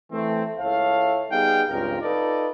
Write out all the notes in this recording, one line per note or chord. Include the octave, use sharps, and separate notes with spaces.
E3 A3 C4
C#2 E4 A4 C#5 F5
G3 B3 D#4 G#4 F5 G5
C#2 G2 C4 F4 A#4
D#4 F4 A4 B4 D5 D#5